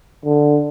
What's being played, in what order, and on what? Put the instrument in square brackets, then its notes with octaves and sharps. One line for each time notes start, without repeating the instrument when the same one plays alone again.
[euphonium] D3